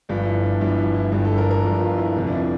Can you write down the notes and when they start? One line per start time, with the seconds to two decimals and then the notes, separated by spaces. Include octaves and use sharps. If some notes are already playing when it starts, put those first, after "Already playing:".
0.09 G1 G2 F3 D4
0.26 E4
0.43 D4
0.60 G1 G2 F3 E4
0.78 E4
0.95 E4
1.12 G1 G2 F3 G4
1.25 A4
1.38 A#4
1.51 A#4
1.64 G1 G2 F3
1.81 F4
1.98 E4
2.16 F1 F2 D3 F3
2.27 D4
2.33 E4